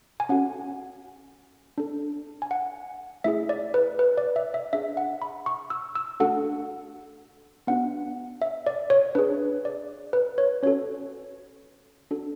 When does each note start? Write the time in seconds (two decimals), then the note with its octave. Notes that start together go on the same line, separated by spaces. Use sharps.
0.20 G#5
0.29 C#4 F#4 A4 F#5
1.78 D4 A4
2.42 G#5
2.51 F#5
3.24 A3 E4 G#4 E5
3.49 D5
3.74 B4
3.99 B4
4.18 D5
4.36 E5
4.54 E5
4.73 D4 G#4 E5
4.97 F#5
5.22 B5
5.46 C#6
5.70 E6
5.95 E6
6.20 A3 D4 F#4 A4 F#5
7.67 B3 D4 F#4 F#5
8.42 E5
8.67 D5
8.90 C#5
9.15 D4 G#4 B4
9.65 D5
10.13 B4
10.38 C#5
10.63 C#4 F#4 A4 C#5
12.11 D4 F#4 A4